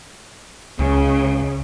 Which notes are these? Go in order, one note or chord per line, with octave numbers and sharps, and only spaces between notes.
C#2 C#3